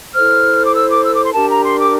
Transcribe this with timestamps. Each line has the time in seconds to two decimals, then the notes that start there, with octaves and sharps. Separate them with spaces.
0.14 E4 A4 C5 F6
0.65 D6
0.74 E6
0.90 D6
1.05 E6
1.14 D6
1.24 C6
1.34 D4 G4 A#4 A5
1.49 A#5
1.63 C6
1.79 D6